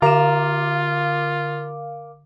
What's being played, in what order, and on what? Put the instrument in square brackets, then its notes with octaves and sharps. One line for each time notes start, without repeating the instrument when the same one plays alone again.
[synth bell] D3 [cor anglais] F4 [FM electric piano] A#4 F5 D6 [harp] A#5 E7